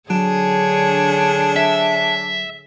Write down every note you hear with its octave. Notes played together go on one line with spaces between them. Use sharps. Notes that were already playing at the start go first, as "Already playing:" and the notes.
D3 F#3 D4 G#4 C#5
E5